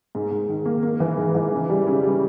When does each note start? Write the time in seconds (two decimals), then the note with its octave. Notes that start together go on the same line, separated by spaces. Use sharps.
0.15 G#2
0.31 G#2
0.48 D#3
0.66 A#3
0.83 A#3
1.00 E3
1.18 G#2
1.35 E3
1.52 C#3
1.70 G3
1.86 C#3
2.03 G3